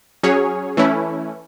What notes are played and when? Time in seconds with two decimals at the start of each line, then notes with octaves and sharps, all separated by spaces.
0.23 F#3 C#4 G#4 C#5
0.77 E3 A3 C#4 E4